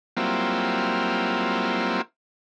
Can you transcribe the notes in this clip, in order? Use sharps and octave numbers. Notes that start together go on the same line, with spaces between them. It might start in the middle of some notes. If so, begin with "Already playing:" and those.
F#3 G3 A#3 C4 E4 F4